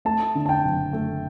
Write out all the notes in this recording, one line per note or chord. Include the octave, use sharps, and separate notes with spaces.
A3 A5
D3
A5
G5
F#1
A3